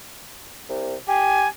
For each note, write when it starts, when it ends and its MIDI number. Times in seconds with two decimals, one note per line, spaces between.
0.70 0.95 36
1.08 1.45 67
1.08 1.48 80